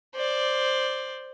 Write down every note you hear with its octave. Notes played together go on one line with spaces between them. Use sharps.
C5 D5